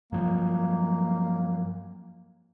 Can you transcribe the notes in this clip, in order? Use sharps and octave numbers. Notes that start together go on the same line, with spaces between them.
G2 F3 F#3 A#3